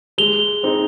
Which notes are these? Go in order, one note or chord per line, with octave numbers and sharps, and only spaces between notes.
G#3 F7 G7
C4 D#4 G#4